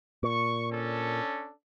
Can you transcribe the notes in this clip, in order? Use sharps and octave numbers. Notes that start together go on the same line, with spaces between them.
A#2 C#6
C#4 D4 A4